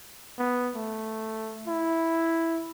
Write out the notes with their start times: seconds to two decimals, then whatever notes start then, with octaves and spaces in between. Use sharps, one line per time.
0.39 B3
0.75 A3
1.67 E4